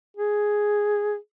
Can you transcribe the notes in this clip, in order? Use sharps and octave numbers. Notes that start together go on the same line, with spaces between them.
G#4